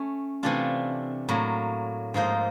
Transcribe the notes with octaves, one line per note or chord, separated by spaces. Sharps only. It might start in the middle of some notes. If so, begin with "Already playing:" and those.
Already playing: A3 C#4
C3 E3 A3 D4 F4
A2 F#3 A#3
G#2 F3 A#3 D#4